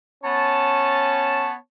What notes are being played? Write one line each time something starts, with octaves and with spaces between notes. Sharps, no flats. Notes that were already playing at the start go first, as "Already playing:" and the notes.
B3 C#4 C#5 A5